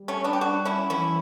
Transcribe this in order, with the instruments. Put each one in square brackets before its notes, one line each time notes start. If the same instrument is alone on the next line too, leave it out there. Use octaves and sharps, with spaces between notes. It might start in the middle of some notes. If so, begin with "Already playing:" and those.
Already playing: [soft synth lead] G3
[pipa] A3 C#4
B3 D4
G4
D4 F#4
C#4 E4
[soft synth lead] E3 [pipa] C#4 E4